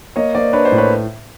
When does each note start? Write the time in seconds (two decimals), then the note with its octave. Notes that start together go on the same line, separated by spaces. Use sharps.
0.16 A#3 C#5 D#5
0.34 A#3 C5 D5
0.53 D4 B4 C#5
0.65 C5 D5
0.72 A2
0.78 B4 C#5